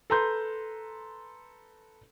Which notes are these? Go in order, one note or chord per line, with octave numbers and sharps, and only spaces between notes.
A4 B4 A#5 C6 G6